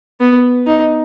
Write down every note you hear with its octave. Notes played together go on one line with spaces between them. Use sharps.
B3
D#4